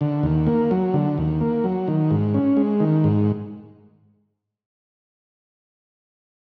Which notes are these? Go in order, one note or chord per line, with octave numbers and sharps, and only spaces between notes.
D3
D#2
A#3
F#3
D3
D#2
A#3
F#3
D#3
G#2
C#4
G#3
D#3
G#2